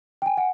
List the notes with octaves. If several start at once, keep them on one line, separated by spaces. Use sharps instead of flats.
G5
G#5
F#5